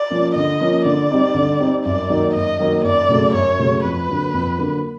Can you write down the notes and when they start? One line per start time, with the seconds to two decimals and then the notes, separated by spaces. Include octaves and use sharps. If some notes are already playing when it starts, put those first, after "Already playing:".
Already playing: D5
0.10 F3 A#3 C#4
0.35 D3 D#5
0.61 F3 A#3 C#4
0.85 D3 D5
1.11 G3 C4 D#4
1.35 D3
1.60 G3 C4 D#4
1.85 F#2 D5
2.09 D#3 F#3 A#3 D#4
2.35 F#2 D#5
2.60 D#3 F#3 A#3 D#4
2.84 F#2 D5
3.09 C#3 F#3 A3
3.33 F#2 C#5
3.59 C#3 F#3 A3
3.83 F2 B4
4.08 D3 F#3 A#3
4.34 F2
4.58 D3 F#3 A#3